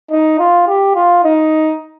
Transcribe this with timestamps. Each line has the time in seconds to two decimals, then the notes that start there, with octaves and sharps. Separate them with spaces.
0.10 D#4
0.39 F4
0.67 G4
0.95 F4
1.24 D#4